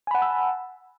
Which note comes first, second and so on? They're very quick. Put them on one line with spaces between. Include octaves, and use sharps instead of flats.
G#5 B5 F#5 A5 E6